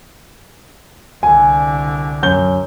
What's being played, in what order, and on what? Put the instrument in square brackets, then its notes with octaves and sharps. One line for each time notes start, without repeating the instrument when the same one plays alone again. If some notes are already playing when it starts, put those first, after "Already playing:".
[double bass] C2 D3 [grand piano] G#5
[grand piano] F#2 G6 G7